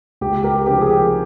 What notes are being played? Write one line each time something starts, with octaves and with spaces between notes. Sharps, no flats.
C#2 G4
G4 A#4
C3 F3 G4 A#4
G#4
G4